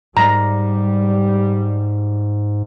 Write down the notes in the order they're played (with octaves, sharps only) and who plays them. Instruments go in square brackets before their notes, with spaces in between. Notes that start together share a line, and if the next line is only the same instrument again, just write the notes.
[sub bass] G#2 [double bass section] G3 [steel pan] A#5